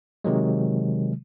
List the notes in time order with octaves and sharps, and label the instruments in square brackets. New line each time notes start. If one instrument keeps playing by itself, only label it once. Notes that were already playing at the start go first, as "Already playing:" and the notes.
[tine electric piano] C3 D#3 F#3 G#3